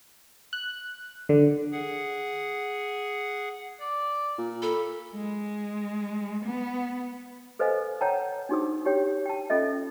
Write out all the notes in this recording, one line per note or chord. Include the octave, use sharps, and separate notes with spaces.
F#6
D3
G#4 F#5
D5
A#2
A4 B5
G#3
B3
A4 B4 C5 D#5 F5 G#5
C#5 F#5 G5 A5 A#5
D4 D#4 F#4 G#4 C5 D#6
D#4 G4 C#5 G5
G5 A5
C#4 F4 A4 D#5 E5